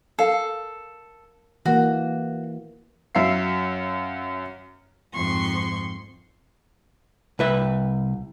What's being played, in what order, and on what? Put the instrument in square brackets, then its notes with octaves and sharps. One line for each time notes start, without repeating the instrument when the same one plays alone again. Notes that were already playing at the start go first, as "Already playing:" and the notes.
[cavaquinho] A4 [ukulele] A#4 F5
[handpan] E3 A#3 [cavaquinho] F#4
[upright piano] F#2 E5 F5 C7
[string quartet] F2 G#2 C6 C#6
[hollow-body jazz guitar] C2 B4 E5